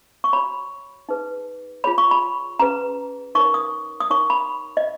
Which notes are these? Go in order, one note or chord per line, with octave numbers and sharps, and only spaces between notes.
C#6
F#4 C#5 B5
D#4 G#4 B4
F4 G#4 C#5 B5
C#6
B5
C#4 G#4 B4 A#5
D#4 A#4 C#5 C#6
D#6
D#6
D#4 A#4 C#5 C#6
B5
D#5